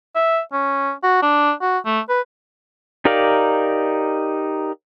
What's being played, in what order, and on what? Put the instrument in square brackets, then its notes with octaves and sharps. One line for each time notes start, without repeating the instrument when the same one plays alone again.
[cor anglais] E5
C#4
F#4
D4
F#4
A3
B4
[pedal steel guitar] D#4 G4 A#4 D5 F5